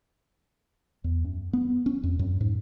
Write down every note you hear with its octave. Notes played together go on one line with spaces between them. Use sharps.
E2
F#2
B3
C#4
F2
F#2
G#2